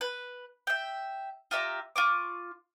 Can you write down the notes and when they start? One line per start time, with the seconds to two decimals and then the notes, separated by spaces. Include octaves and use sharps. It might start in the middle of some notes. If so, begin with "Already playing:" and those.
0.01 B4
0.67 E5 G5
1.51 F4 G4 E5 A#5
1.96 F4 C#6 D6